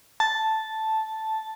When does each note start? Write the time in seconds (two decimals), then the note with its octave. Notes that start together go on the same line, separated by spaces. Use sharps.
0.20 A5